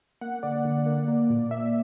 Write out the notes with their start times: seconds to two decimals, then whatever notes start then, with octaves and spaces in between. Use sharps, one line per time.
0.21 A#3 F#5
0.43 D3 D5
0.65 D3
0.86 A#3
1.08 A#3
1.30 A#2
1.51 A#2 E5